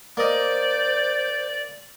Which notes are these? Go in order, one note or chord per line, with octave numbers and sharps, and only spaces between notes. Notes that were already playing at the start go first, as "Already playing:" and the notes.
A#3 C5 D5 D#5